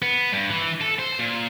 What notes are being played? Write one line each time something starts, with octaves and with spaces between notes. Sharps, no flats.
B3
G2
E3
A4
C5
A#2